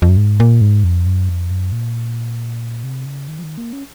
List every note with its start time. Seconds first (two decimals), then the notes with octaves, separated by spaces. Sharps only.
0.02 F2
0.09 F#2
0.17 G#2
0.40 A#2
0.61 G#2
0.84 F2
1.06 F#2
1.29 F2
1.51 F#2
1.72 A#2
2.84 C3
3.06 C#3
3.28 D#3
3.39 F3
3.43 D#3
3.58 A#3
3.73 C#4